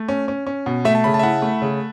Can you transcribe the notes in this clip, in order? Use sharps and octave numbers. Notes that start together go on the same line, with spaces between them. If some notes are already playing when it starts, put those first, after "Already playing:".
Already playing: A3
C#4
C#4
C#4
B2
A3 E5
A5
C#3 B5
A5
E5
E4 F#5
A3
C#3